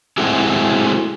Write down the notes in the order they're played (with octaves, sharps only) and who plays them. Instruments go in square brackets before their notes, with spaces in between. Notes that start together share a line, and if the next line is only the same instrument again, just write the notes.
[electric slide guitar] G#3 A3 C4 E4 F#4 G4